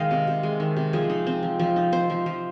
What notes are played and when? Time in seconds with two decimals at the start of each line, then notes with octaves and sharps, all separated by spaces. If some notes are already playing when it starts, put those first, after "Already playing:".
Already playing: D#3 G#3 D#5 F5 G5
0.11 C3
0.27 C3
0.43 G#3
0.60 D#3
0.77 C3
0.93 F3 G#4
1.10 D#4
1.27 C4
1.43 F3
1.60 F3
1.76 D#4
1.92 C4 C5
2.10 F3
2.26 F3